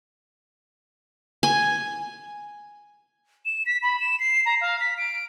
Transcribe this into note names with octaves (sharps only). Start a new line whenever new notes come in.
G#5
E7
B6
B5
E7
C7
A#5
F5
B6
D7